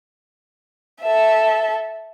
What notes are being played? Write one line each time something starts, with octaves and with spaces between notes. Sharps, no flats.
A4 E5